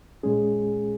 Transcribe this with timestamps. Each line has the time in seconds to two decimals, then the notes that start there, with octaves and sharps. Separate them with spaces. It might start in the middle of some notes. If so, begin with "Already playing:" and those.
0.23 A#2 G#3 C#4 G#4